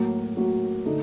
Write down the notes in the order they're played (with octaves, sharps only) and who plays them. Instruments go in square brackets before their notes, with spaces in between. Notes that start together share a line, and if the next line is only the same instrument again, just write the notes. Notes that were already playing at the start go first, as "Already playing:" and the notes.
Already playing: [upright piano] A2 F#3 A#3 F#4
A2 F#3 A#3 F#4
D3 A3 D#4